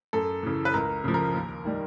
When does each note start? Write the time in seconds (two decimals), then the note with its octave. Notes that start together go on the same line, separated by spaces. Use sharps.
0.13 F#2 A4
0.43 C#3 E3
0.65 B4
0.74 C#2 A#4
1.04 C#3 F3
1.14 A#4
1.34 D#2
1.65 D#3 G3